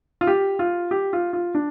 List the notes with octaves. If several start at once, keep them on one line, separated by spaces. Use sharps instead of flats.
F4
G4
F4
G4
F4
F4
D4